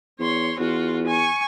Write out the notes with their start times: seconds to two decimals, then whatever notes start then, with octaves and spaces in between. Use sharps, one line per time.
0.20 E2 C#5 C6
0.59 E2 F4 F#4
1.07 G#5 C#6